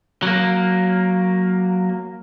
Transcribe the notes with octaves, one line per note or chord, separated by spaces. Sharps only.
F#3 A#3